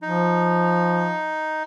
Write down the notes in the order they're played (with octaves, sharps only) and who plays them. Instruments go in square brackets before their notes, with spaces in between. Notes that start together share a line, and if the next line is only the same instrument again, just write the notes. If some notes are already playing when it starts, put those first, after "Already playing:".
[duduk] F3 [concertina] D#4